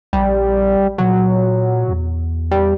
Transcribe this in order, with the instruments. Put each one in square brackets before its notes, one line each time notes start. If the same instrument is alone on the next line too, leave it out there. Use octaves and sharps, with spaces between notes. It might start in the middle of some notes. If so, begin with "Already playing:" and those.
[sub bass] A#1 [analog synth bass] G3
[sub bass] A#2 [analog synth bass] F#3
[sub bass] E2
[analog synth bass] G3